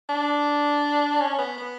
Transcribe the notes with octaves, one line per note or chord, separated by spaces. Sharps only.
D4
C#4
B3
B3